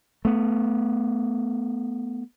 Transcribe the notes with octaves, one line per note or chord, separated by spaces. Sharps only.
A3 B3